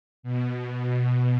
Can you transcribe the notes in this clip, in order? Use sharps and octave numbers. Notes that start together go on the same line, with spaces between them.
B2